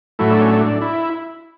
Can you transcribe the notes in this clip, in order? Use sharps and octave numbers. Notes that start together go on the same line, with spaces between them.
A2 F#3 A3 E4
D4
C#4
D4
E4